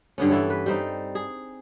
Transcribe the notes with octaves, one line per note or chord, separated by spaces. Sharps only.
G2 D3 B3 C#4
E3 E4 A4 C#5
B4
G3 C4 D#4
G#4